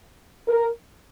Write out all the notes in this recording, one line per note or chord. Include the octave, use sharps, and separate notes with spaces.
A#4